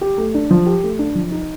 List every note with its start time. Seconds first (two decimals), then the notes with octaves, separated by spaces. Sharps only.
0.01 G4
0.18 A3
0.34 D4
0.51 F3
0.66 G4
0.83 A3
0.99 D4
1.15 F3
1.31 D#4